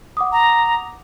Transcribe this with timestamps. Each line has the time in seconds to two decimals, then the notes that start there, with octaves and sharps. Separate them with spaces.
0.17 F#5 D6 D#6
0.32 A#5